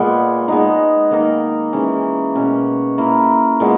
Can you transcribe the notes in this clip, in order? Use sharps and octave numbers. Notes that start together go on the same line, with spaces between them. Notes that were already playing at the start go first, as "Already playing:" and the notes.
Already playing: A#2 G#3 B3
G#3 B3 D#4
D#3 A#3 D#4
E3 G#3 C#4
B2 A#3 C#4
A#3 E4 A#4
A#2 G#3 B3